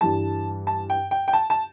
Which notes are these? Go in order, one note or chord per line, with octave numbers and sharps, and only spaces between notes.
G2 E3 G3 A5
A5
G5
G5
G5
A5
A5